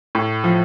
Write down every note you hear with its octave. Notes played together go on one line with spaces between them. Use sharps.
A2
F3